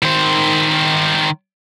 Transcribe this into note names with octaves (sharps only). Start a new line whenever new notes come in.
D#3 C5